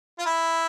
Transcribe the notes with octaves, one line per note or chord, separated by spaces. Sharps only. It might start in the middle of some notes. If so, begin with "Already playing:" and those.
F4
E4